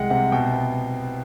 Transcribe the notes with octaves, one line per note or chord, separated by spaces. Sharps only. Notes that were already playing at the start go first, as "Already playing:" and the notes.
Already playing: C2 G#3 F#5 G5
C3 F#5
B2 G5
B3